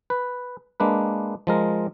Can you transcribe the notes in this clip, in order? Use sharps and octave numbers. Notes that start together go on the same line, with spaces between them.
B4
G#3 A#3 D4 B4
F3 G#3 A#4